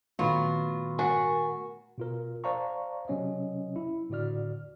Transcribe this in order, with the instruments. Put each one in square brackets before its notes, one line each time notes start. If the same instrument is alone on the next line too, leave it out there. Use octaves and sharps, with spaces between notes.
[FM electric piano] A#2 D#3 A3 [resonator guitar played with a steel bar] F#3 B3 F4
[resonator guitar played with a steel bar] F#4 [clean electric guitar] A#4 F#5 G#5
[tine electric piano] B2 F4 A#4
C5 D5 F5 A5 A#5 C#6
C3 F#3 C#4 C#5 D#5
E4
A2 D3 F#4 D5 F6